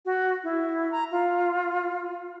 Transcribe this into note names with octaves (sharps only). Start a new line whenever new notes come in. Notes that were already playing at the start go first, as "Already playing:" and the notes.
F#4
E4
A#5
F4